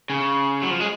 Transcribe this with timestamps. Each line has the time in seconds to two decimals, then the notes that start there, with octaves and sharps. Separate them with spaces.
0.10 C#3
0.62 F#3
0.70 F3
0.80 G#3